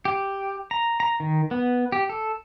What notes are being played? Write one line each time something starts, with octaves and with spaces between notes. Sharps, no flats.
G4
A#5
A#5
D#3
B3
G4
A4